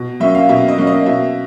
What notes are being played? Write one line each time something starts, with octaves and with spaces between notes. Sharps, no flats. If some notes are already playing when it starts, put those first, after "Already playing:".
Already playing: B2
F#3 A#3 C#4 E5
F5
B2 E5
D#5
F#3 A#3 C#4
D#5
B2 E5